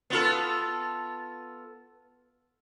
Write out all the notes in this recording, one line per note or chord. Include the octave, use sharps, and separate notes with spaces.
B3 F4 A4